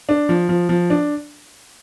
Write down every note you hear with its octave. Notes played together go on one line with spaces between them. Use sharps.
D4
F3
F3
F3
D4